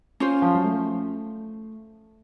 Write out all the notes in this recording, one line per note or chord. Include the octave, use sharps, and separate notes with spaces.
C#4 F4 C5
F3
F#3
A3